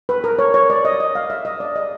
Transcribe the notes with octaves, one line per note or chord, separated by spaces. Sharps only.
B4
A#4
C#5
C#5
D5
D#5
D#5
F5
E5
D#5
D5
D#5